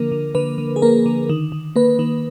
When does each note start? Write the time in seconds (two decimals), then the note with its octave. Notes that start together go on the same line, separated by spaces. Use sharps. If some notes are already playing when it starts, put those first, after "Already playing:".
Already playing: D3 F3 A#3 A#4
0.12 D3
0.35 D3 B4
0.58 D3
0.76 G#4
0.82 A#3 A#4
1.06 D3
1.29 D#3
1.52 D#3
1.76 A#3 B4
1.99 D#3